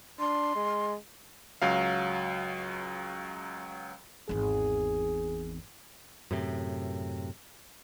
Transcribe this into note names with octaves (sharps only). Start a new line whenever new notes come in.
D4 C6
G#3
C#2 F#3 F5
G#1 E2 G#4
F#2 A2 C3